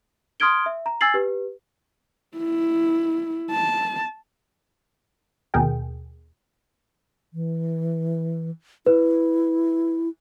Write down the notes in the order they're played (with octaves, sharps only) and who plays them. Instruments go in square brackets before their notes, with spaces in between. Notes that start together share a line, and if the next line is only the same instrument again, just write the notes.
[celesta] C6 D#6 F6 G#6 D7 G7
E5
A#5
G#5 E6 G#6 A6 C7 F#7
G4 B4
[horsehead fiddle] E4
A5
[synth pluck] D#2 B2 G#4 A#4 G5
[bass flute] E3
[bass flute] E4 [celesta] B4